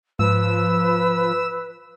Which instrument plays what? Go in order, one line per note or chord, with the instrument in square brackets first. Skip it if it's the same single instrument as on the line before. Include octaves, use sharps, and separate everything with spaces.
[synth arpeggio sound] G#2 [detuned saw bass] F3 [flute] B4 [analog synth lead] E6